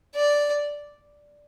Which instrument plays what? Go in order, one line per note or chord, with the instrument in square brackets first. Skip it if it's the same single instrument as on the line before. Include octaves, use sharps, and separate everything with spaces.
[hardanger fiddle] D5